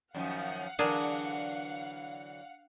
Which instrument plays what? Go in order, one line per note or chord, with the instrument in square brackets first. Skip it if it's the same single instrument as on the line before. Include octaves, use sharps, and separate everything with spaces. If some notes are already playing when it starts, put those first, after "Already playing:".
[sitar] F#2 D#3 F3 [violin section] F5 F#5
[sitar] D3 E3 F#3 [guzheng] D4 G#4 A#4